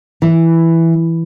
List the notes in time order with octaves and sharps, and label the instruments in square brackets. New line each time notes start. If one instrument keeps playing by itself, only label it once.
[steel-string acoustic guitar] E3